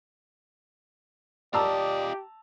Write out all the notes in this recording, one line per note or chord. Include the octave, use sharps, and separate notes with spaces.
F4 G4 D5 D#5 A5 A#5 E6